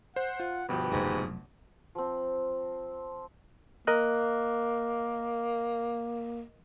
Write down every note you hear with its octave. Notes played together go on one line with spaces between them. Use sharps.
C5 F#5
F4
G1 B2 F3 G4 B4
F1 G#2 F#3
F3 C4
A#3 A#4 D#5 F#6